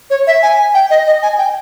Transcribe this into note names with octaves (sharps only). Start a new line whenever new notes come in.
C#5
E5
G#5
G5
D#5
D#5
G#5
G5